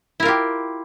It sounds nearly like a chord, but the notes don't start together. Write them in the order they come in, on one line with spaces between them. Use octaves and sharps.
E4 A#4 F4 G4